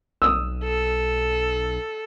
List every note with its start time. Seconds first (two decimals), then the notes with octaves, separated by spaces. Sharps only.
0.22 B1 D#6 E6
0.64 A4